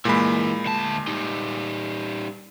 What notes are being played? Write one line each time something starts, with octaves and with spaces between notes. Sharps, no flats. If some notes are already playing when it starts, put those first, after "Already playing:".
A#2 E3 G#3 A#3 B5
D2 A5
G3 D#4